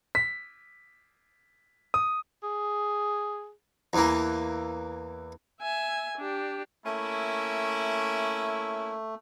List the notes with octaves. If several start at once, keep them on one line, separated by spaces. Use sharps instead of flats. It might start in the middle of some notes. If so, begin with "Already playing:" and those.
B6
D#6
G#4
E2 E3 A#3
E5 G#5
D4 G4
A3 A#3 C#4 E4